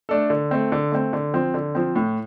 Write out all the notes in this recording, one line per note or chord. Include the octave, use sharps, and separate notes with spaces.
A3 D4 A4
D3
A3 C4
D3
A3 C4
D3
F3 C4
D3
F3 C4
A2